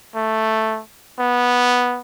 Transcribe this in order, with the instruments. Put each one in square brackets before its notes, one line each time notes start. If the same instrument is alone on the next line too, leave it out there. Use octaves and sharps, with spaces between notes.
[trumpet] A3
B3